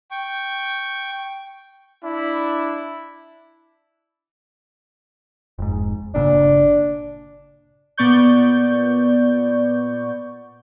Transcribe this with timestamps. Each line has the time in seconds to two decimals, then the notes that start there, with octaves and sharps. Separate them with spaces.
0.11 G5 C#6
2.04 D4 E4
5.59 F1 G#2
6.14 G1 A#2 C#3 D4
7.98 A#2 B3 D5 C#6 G6